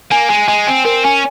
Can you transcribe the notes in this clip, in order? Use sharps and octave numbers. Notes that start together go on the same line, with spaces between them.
A#3 G#5
G#3 G#5
G#3 G#5
C4 G#5
C4 A#4
C#4 G#5